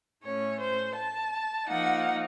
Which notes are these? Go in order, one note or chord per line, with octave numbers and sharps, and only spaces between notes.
A2 A3 C#4 C#5
C5
A5
F3 A#3 D#4 F#5